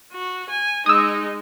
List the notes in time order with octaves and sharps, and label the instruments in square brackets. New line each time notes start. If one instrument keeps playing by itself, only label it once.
[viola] F#4
G#5
[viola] G#3 D#4 [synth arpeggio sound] D#6 E6